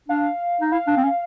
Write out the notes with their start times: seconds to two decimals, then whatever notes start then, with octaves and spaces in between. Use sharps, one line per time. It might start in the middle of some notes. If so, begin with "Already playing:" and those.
0.08 D4 F5
0.61 D#4
0.72 E4 F5
0.87 D4
0.97 C4
1.04 C#4